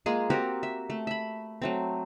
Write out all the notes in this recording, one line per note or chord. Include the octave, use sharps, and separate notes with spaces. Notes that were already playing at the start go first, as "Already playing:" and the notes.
G#3 A#3 F4 G#4
C4 F#4 G4 A#4
E5
A3
E5 B5
F#3 A3 C4